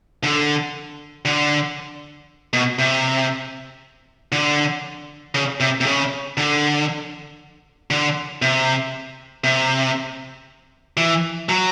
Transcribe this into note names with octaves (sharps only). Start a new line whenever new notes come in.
D3
D3
B2
C3
D3
C#3
C3
C3
C#3
D3
D3
C3
C3
E3
F#3